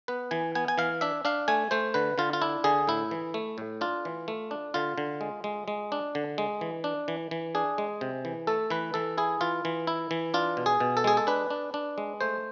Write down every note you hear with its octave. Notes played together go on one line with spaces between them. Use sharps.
B3 B4
E3 G#5
B3 G#5
G#5
E3 F5
D4 E5
D4 F5
A3 G#5
A3 C5
D3 B4
D3 F4
F4
D4 E4
D3 G#4
A2 E4
E3
A3
A2
D4 F4
E3
A3
D4
D3 F4
D3
G#3
G#3
G#3
D4
D3
G#3
E3
D4
E3
E3
D4 G#4
G#3
C3
E3
A3 A4
E3 B4
E3 A4
E4 G#4
E3 F4
E3
E4
E3
D4 F4
B2
G#4
B2
A4
G#3 G#4
A4
D4 B4
D4
D4
G#3
A3 C5